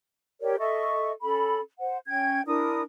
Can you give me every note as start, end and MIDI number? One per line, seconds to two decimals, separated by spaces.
0.40 0.55 67
0.40 0.55 70
0.40 0.55 73
0.40 0.55 74
0.58 1.11 69
0.58 1.11 75
0.58 1.11 76
0.58 1.11 85
1.22 1.59 61
1.22 1.59 69
1.22 1.59 83
1.79 1.97 72
1.79 1.97 78
2.07 2.41 61
2.07 2.41 79
2.07 2.41 92
2.46 2.81 62
2.46 2.81 64
2.46 2.81 70
2.46 2.81 87